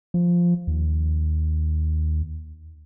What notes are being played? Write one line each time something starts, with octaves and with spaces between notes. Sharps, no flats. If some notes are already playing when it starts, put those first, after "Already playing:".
F3
D#2